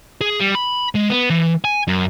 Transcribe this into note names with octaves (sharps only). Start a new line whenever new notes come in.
G#4
G3
B5
G#3
B3
E3
G#5
F#2